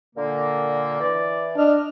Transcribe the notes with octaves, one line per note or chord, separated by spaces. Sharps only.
A#2 D3 A#3
E3 D5
D4 D#5 F6